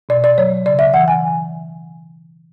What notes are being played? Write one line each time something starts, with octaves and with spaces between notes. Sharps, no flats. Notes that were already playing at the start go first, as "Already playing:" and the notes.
B2 D5
D5
F#3 C#5
C#3 D5
E5
E3 F#5
G#5